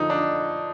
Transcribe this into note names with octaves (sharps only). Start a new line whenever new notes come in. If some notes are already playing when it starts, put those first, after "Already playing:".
Already playing: F2 D3 F3 D#4
D4